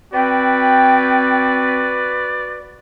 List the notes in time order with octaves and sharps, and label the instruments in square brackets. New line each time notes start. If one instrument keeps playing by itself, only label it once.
[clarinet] C4 [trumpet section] F#4 B4 [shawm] D5 [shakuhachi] G5